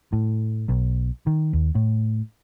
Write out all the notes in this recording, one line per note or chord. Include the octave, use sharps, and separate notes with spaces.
A2
B1
D#3
D#2
A2